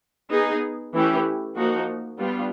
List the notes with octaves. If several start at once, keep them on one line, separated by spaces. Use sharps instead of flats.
B3 D#4 G#4
E3 A3 C#4 E4 G4
F3 A#3 D#4 F#4
G3 B3 D4 F4